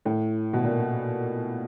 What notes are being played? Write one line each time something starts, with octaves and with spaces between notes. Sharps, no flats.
A2
B2
A#2